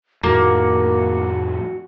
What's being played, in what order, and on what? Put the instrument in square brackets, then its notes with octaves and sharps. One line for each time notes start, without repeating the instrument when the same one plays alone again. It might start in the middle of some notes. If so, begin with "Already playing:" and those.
[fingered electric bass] F2 A2 D#3 [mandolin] A#3 [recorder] F#4